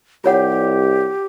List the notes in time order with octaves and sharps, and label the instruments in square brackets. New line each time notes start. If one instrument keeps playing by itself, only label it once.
[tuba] C2 [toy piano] F4 C#5 F#5 [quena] G4